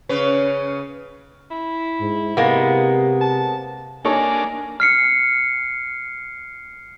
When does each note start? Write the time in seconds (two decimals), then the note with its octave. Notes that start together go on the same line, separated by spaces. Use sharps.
0.09 C#3 C#4 B4
1.51 E4
2.01 G#2
2.37 C3 G#3 A#3 B3
3.21 A5
4.05 A#3 D4 D#4 A4 C#5 G#5
4.80 F6 C7 C#7